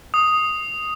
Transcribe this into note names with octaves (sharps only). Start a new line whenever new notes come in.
D#6